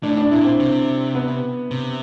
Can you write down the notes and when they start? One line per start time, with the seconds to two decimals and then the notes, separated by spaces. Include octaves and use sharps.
0.03 A2 D4
0.17 D4
0.31 A#2 E4
0.45 C4
0.60 C3
1.15 B3
1.71 C3